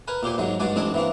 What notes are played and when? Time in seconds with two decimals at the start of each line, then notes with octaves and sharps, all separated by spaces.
0.08 A#4 B4 G#5
0.23 A#2 G4 C5 G#5
0.38 G#2 F#3 G#3
0.60 G2 G#3 F#4 D5 G#5
0.76 A1 C4 D4 D#5 G#5
0.94 E3 A#3 C4